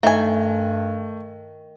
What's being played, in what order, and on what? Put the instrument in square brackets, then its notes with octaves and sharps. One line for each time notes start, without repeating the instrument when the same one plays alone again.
[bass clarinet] G2 [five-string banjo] D#3 G#5 [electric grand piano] A3 [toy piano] E5